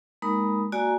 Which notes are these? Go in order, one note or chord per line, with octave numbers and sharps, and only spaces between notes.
G#3 A#3 D#4 A#4 B5 D#6
A#3 F#4 D5 G#5 A#5